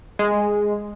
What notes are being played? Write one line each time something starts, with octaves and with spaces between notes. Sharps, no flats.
G#3